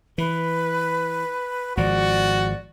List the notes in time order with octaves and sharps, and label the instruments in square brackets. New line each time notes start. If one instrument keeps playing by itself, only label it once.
[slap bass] E3 [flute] B4
[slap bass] G#1 F3 [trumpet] F#4 [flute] D5